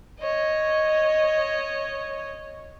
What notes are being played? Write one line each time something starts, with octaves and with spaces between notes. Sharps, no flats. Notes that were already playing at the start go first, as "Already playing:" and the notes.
C#5 D#5